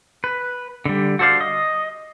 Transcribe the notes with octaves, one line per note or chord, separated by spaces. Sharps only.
B4
D3 G3
F#4 A4 C5 D5 F5
D#5